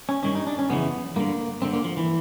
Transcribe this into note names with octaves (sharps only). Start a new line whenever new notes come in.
C#4
G2 D#3 C#4
D#4
D4
C#4
F2 C#3 E3 B3
G2 D3 A#3
G2 D3 C4
A#3
F3
E3